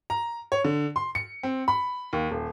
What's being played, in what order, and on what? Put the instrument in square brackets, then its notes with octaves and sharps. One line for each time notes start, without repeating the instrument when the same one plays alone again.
[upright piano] A#5
C#5
D3
C6
C#7
C4
B5
D#2
D#1